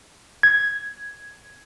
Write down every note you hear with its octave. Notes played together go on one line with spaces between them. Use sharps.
G#6